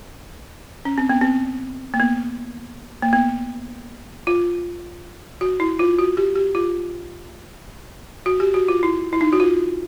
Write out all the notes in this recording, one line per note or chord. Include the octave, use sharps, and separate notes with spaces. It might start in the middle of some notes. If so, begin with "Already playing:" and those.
C#4
C4
B3
C4
A#3
B3
A#3
B3
F4
F#4
E4
F4
F#4
G4
G4
F4
F#4
G4
F#4
F4
E4
E4
D#4
F#4
F4